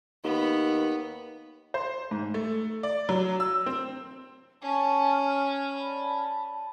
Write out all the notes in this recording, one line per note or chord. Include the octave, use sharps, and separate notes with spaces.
D#2 B3
C5
G#2
A3
D5
F#3
E6
C4
C#4 G#5 A5 C#6
F6
D5 A5 B5